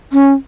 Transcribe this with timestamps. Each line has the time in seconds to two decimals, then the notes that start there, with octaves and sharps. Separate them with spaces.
0.13 C#4